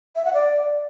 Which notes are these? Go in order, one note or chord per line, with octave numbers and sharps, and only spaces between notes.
E5
F#5
D5